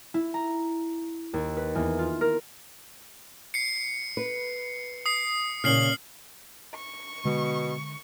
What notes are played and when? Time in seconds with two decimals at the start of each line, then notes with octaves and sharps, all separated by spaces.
0.14 E4
0.34 A#5
1.33 D#2
1.57 B4
1.75 E2
1.99 F4
2.21 A#4
3.54 C7 C#7
4.17 B4
5.06 D#6 C7
5.64 A#2 C#3 F6 C7 F#7
6.76 C#6
7.25 B2 D3 G#3